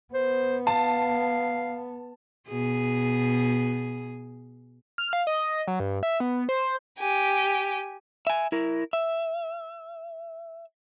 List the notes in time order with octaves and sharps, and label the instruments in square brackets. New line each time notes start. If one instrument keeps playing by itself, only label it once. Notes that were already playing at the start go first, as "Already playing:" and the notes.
[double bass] B3 [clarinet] C5
[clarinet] F5 [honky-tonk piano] A5
[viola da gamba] B2 G#4
[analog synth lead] F6
F5
D#5
F#3
G2
E5
B3
C5
[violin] G4 G#5
[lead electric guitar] E5 G#5
E4 A#4
E5